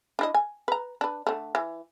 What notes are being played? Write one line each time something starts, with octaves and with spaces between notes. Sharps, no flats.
D4 E4 D#5
G#5
B4 A#5
D4 B4
D3 A3
E3